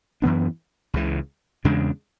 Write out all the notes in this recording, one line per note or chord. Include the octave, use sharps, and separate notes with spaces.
F#2 E3 B3 D4
C#2 C#3 E3
E2 C#3 G#3 D4